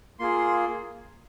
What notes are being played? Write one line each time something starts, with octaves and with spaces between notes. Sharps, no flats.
A#3 F4 G#4 C6